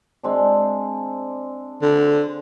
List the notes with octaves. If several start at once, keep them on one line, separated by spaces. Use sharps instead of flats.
G#3 C4 D4
D3